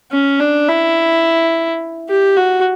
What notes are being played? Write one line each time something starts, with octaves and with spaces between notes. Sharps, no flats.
C#4
D4
E4
G4
F#4